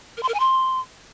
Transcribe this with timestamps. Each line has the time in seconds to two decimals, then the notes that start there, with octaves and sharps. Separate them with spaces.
0.17 A#4
0.23 C6
0.28 A#4
0.34 G#5
0.40 C6